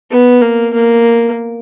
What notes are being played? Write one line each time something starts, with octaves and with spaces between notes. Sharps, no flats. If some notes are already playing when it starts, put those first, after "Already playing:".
B3
A#3
A#3